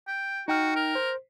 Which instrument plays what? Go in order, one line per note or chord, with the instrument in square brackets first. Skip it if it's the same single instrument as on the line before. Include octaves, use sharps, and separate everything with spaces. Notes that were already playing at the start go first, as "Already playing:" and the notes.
[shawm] G5
[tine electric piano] D#4 G5 F6 [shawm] F#4
[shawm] A#4
[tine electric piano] C5